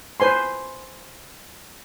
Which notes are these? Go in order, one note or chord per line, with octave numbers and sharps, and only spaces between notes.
B4 C5 G#5 C6